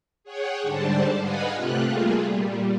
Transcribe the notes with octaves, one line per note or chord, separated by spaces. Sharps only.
G#4 C#5 F#5 G5
G#2 D3 G3 D4 C5 A5
B4 D#5 F5 F#5 G#5 B5
C3 A3 F4 G4 F#6
G3 A3 A#3 F4 G#4
A#2 G3